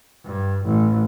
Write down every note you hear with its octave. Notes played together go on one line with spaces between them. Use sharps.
G2
A1